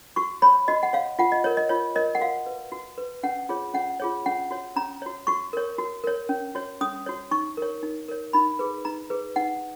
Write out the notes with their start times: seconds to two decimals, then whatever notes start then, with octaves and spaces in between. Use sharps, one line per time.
0.16 F#4 C#6
0.42 C#5 B5
0.68 F#4 D#5
0.83 F#5
0.93 C#5 F5
1.19 F4 F#5
1.32 D#5
1.44 A#4 C#5
1.57 D#5
1.69 F4 C#5
1.95 A#4 C#5 D#5
2.15 F#5
2.21 F#4 F5
2.46 B4
2.72 F#4
2.98 B4
3.23 C#4 F#5
3.49 F4 G#4 C#5
3.74 C#4 F#5
4.00 F4 G#4 C#5
4.26 C#4 F#5
4.51 F#4 C#5
4.76 C#4 A#5
5.02 F#4 C#5
5.27 F#4 C#6
5.53 A#4 C#5
5.78 F#4
6.04 A#4 C#5
6.29 C#4
6.55 F#4 C#5
6.81 C#4 D#6
7.06 F#4 C#5
7.31 D#4 C#6
7.57 A#4 C#5
7.83 D#4
8.09 A#4 C#5
8.33 D#4 B5
8.59 G#4 B4
8.85 D#4 A#5
9.10 G#4 B4
9.36 D#4 F#5